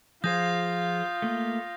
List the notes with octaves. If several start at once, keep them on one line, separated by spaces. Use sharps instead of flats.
F3 F4 G#4 C5 D#6 G6 A#6
A3 A#3